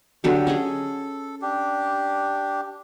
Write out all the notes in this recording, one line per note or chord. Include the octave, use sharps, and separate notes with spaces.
D3 F#3 G4 A4
C#4 G#4 D#5
D4 G4